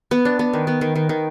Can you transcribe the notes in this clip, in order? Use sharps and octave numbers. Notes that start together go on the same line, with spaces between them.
B3
D4
B3
D#3
B3
D#3
D#3
D#3